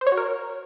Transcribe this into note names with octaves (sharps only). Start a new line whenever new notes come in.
C5
C#5
F#4
A#4